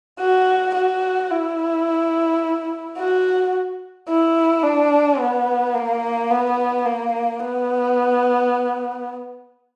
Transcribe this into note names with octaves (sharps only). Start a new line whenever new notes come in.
F#4
F#4
E4
F#4
E4
D4
B3
A#3
B3
A#3
B3